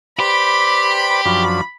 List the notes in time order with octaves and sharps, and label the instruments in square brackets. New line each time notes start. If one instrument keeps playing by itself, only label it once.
[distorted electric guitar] G4 [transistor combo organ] B4 C5 D5 [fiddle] B5
[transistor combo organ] F#2 F3 D4